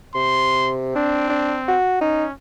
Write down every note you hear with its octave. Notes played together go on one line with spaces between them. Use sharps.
C3 C6
C4 D4
D4
F#4
C#4 D#4